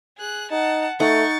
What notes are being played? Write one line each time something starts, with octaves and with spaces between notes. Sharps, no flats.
G#4 F#6
D#4 F#5 A5
A3 D#4 F#5 C#6 A6